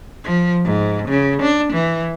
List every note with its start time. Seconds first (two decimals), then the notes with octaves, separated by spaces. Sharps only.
0.24 F3
0.64 G#2
1.09 C#3
1.42 D4
1.73 E3